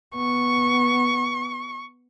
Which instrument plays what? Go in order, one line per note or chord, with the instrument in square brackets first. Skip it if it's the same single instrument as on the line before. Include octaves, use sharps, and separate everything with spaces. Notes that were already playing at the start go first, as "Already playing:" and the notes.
[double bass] B3 [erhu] C#6